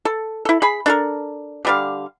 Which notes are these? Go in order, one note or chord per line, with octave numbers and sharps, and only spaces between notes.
A4
E4 A4
G#4 B5
D4 A4 A#4
D3 G3 F5